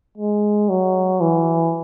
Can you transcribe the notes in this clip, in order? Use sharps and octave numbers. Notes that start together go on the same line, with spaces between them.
G#3
F#3
E3